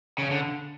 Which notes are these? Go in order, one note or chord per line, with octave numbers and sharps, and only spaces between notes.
C#3
D3